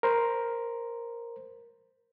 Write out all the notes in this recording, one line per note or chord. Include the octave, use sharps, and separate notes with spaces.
A#4 C5